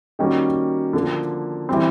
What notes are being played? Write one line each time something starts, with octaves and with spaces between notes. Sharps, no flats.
D#3 G3 A#3 C#4 F#4
D3 F3 A#3
E3 G3 C4